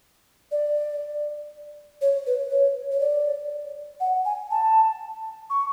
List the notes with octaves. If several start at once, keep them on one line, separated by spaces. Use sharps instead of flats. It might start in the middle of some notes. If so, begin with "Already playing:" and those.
D5
C#5
B4
C#5
C#5
D5
F#5
G#5
A5
C#6